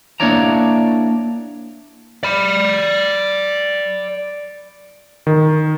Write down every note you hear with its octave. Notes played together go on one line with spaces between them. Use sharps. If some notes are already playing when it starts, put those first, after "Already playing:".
A#3 D4 E4 C#5 D5 A#5
D5 B5
D#3